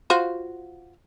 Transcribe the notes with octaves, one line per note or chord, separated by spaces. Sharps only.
F4 F#4 C5